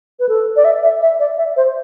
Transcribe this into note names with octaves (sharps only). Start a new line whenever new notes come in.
B4
A4
D5
E5
E5
E5
D5
E5
C5